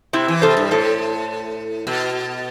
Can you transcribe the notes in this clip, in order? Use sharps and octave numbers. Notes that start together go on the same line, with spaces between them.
C3 C4 E4
E3
C3 A4 C5
G2
A2 A4 C5
B2